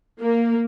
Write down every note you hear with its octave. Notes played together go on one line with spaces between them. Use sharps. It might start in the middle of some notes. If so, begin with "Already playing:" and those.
A#3